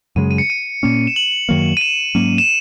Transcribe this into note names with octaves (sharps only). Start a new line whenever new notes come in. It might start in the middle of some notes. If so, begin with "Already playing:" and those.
F#2 C#3 G#3 D#7
D#7
C#7
D#7
A#2 A#3 C#4
E7
F#7
F#2 D#3 F#3 A#3
D#7
E7
G#2 F#3 A#3 C#4
E7